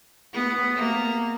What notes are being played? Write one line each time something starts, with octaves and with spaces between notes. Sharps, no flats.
B3
A#3